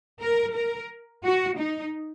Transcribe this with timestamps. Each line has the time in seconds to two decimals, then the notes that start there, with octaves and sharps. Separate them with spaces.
0.21 A#4
0.55 A#4
1.23 F#4
1.58 D#4